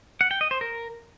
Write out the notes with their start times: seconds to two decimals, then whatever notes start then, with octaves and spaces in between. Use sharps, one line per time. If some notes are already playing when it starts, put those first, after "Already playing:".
0.21 F#5
0.31 G5
0.41 D#5
0.51 C5
0.61 A#4